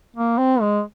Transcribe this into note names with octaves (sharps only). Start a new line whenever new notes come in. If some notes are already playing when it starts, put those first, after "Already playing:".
A#3
C4
G#3